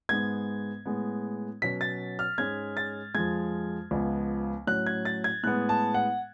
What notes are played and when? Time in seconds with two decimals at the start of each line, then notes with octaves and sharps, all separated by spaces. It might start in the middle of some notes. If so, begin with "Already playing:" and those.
0.09 G#2 G#3 B3 G#6
0.86 A2 G#3 B3
1.62 B2 F#3 C#4 B6
1.81 A6
2.19 F6
2.38 G#2 G#3 C#4 G#6
2.77 A6
3.15 F2 F3 G#3 G#6
3.91 C#2 C#3 F3 B3
4.67 A2 F#3 C#4 F#6
4.86 G#6
5.05 A6
5.24 G#6
5.43 A2 G#3 B3 F#6
5.69 A5
5.94 F#5